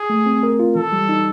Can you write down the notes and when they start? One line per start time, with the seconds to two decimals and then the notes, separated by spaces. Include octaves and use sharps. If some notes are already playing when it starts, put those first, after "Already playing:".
Already playing: G#4
0.10 A3
0.26 C4
0.43 A#4
0.59 F4
0.76 E3 A4
0.92 G3
1.09 D#4